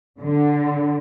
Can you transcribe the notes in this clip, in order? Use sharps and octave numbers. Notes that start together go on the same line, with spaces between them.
D3